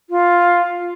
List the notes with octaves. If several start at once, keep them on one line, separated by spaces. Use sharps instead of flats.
F4